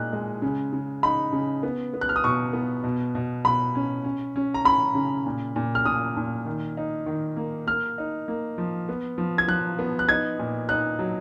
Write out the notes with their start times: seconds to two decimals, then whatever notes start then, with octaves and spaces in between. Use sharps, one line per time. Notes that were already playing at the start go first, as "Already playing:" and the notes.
Already playing: A#2 G#3 D#4 F#6
0.13 G#3
0.42 C#3
0.73 C#3
1.03 D#4 B5
1.33 C#3
1.63 B3
1.94 B3
2.01 F#6
2.09 F6
2.16 D#6
2.24 B2 C#6
2.53 B3
2.83 B2
3.15 B2
3.45 B2 B5
3.75 C#4
4.04 C#4
4.36 C#4
4.54 A#5
4.65 C#4 B5
4.95 C#3
5.26 A#2
5.56 A#2
5.75 F6
5.85 A#2 D#6
6.17 A#2
6.46 D#3
6.77 D#4
7.06 D#3
7.36 A#3
7.67 A#3 F6
7.98 D#4
8.28 A#3
8.58 F3
8.89 B3
9.18 F3
9.38 G#6
9.48 F3 F#6
9.79 B3
9.99 F#6
10.09 D#4 G#6
10.39 A#2
10.69 D#4 F#6
10.99 F#3